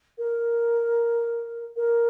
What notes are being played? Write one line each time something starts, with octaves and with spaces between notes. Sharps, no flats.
A#4
A#4